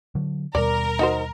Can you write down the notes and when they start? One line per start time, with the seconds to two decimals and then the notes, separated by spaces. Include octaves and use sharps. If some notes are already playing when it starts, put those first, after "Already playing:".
0.15 D3 F#3
0.55 D#2 B2 G3 A#4 D5
0.99 D#4 F#4 C5